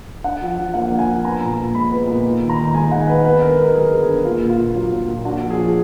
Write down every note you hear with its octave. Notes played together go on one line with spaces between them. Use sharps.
D4 F#5
F3
F3
A#3 F#5
D4
G#5
F3
B3 A#5
A#2
A#2
G#3 B5
B3
A#2
D#4
D#3
A#5
D#3
G#3 G#5
D#4 F#5
D#3 B4
B3 B4
D3 A#4
D#4 A#4
F#3 G#4
B3
D3
A#3 F4
A#2
F4
A#2
F#3
A#3
A#2
D4 F#4
F3
G#4
F3